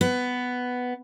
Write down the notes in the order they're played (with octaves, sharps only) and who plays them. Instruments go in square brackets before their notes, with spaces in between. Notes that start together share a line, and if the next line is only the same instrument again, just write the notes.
[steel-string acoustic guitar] B3